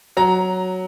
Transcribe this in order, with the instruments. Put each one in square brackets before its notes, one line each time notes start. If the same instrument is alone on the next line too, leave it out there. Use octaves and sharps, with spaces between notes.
[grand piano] F#3 A#5